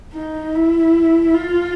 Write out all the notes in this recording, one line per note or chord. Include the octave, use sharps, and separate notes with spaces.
D#4
E4
F4